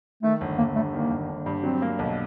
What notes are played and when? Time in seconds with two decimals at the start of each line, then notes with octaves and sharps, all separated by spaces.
0.23 D#3 A3
0.41 G1
0.58 G1 A#3
0.76 G2 A3
0.94 D#3 A#3
1.11 G1
1.29 G1
1.46 G2
1.63 F#3 C4
1.82 A#3
1.99 B1